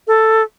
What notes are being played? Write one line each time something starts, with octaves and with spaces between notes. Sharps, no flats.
A4